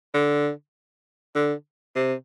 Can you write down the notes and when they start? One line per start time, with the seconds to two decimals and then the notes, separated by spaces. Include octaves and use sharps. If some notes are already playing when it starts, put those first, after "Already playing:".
0.14 D3
1.35 D3
1.95 C3